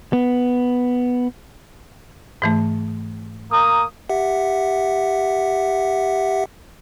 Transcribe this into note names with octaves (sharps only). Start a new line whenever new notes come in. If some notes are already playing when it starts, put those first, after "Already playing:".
B3
G#2 E3 A3
A#3 A#5 D#6
G4 E5 F#5